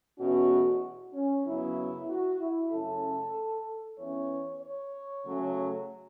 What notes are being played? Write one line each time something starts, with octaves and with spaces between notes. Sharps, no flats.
E2 B2 A3 C#4 F#4
C#4
F#2 C#3 F#3 B3 E4
F#4
E4
F#2 C#3 A3 C#4 A4
E2 E3 C#4 C#5
C#5
C#3 F#3 A3 C#4